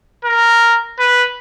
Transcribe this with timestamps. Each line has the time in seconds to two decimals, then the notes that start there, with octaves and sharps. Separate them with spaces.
0.25 A#4
0.99 B4